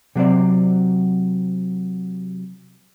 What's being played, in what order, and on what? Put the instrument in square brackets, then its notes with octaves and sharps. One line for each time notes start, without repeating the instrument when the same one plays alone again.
[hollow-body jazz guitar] C3 F#3 C4 D5